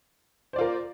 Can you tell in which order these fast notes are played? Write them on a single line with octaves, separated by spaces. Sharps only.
C5 D5 F4 A#4